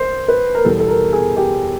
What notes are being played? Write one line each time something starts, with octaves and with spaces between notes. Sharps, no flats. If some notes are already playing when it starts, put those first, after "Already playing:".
Already playing: C5
B4
A#4
E2 B2 G3 A4
A4
A#4
G#4
G4